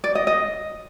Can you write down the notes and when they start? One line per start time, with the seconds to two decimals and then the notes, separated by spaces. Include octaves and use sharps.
0.04 D5
0.15 D#5
0.27 D#5